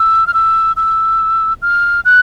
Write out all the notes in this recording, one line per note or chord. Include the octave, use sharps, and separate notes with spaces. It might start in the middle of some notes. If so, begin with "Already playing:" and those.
Already playing: E6
F6
E6
E6
F6
F#6